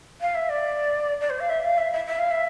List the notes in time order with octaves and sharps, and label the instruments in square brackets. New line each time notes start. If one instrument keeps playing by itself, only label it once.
[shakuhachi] F5
E5
D5
D5
C5
F5
E5
F5
E5
E5
E5
F5
E5